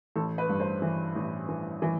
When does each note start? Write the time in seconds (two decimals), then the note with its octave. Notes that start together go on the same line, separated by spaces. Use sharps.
0.16 A1 A4
0.38 B4
0.49 G2
0.60 C5
0.82 E3
1.15 A1
1.49 E3
1.82 E3